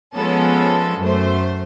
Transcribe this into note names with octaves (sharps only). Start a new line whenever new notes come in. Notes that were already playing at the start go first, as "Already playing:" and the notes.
F3 G#3 B3 C#4 A4
F#2 A3 C5